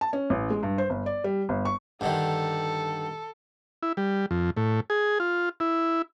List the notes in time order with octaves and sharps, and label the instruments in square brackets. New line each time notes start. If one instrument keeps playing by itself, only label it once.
[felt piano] A5
C#4
A1
G#3
G2
C5
G1
D5
G3
G1
C#6
[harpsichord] G2 D3 D#3 [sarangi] A4
[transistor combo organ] E4
G3
F2
A2
G#4
F4
E4